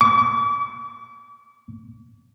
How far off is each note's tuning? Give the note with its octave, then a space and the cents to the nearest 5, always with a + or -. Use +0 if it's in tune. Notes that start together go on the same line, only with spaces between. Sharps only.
D6 -40